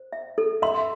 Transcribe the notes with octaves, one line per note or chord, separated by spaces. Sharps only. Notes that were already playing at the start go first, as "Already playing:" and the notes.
Already playing: C5
E5
A4
E5 C6